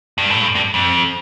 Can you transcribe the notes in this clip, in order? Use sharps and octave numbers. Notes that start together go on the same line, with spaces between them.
G2
A2
G2
G2
F2